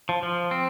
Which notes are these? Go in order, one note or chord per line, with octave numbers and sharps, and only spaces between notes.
F3
F3
C4